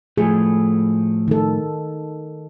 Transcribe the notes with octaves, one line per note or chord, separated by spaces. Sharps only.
A2 F3 A3 G#4
D#3 A4